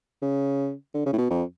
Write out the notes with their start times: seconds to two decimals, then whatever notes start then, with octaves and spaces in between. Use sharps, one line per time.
0.22 C#3
0.94 D3
1.06 C#3
1.13 A2
1.18 B2
1.30 F2